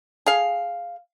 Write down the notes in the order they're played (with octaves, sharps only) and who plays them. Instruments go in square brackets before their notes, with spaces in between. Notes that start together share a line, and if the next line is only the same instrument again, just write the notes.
[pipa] G#4 F5